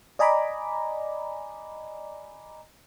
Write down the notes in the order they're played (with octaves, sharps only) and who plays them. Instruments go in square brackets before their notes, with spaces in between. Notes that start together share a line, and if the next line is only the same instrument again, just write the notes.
[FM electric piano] D5 D#5 G#5 A#5 B5 D6